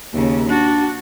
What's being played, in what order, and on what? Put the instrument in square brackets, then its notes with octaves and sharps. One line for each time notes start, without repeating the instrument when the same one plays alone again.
[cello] D#2 C#3
[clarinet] D4 [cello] F#4